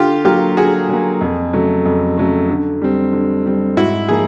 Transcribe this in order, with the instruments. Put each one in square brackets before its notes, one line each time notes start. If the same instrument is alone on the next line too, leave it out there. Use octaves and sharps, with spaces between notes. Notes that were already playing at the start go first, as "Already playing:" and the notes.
Already playing: [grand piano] D3 [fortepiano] F4 G4
[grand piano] F#3 A#3 [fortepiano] F4 G4
[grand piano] D3 [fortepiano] F#4 G#4
[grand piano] F#3 A#3
F2
C#3 F#3 A3
F2
C#3 F#3 A3
D3
G3 C4
D3
G3 C4
[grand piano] G#2 [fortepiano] E4 F#4
[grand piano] F3 A#3 D#4 [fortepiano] G#4